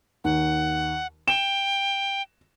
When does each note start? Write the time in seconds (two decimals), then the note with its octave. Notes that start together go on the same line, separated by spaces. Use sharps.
0.24 D#2 F#5
1.28 G5 E7